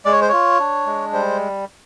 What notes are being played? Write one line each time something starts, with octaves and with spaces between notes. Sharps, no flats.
G#3 D5
C#5
C5
F4 C#5
D4
G#3
G3 C5